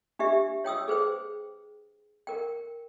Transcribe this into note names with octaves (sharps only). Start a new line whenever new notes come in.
D4 G4 E5
C#5 G5 D#6 E6
G#4 B4 C5 G5
A#4 G5